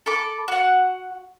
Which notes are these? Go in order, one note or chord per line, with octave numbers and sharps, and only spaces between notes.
A4 B5 D6
F#4 F#5